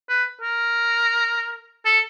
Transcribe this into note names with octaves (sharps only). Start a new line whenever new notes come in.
B4
A#4
A4